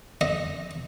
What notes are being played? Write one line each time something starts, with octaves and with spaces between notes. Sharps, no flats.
D#5